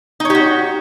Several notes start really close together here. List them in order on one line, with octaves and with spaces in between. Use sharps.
D#4 C#5 G4 F#4